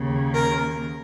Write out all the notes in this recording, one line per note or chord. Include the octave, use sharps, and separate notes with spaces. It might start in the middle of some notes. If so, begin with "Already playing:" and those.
Already playing: D#2 C#3
A#4